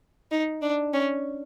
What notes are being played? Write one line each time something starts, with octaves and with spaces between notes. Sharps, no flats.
D#4
D4
C#4